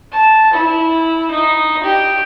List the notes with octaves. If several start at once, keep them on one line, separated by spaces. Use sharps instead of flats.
A5
E4
D#4
G4